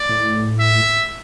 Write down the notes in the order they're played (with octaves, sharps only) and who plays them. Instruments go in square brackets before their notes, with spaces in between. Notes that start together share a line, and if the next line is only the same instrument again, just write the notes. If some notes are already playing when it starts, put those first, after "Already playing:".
Already playing: [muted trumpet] D5
[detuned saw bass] A2
[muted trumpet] E5